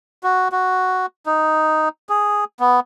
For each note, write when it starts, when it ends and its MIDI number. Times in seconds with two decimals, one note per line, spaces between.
0.23 0.48 66
0.52 1.06 66
1.26 1.89 63
2.09 2.44 68
2.60 2.80 59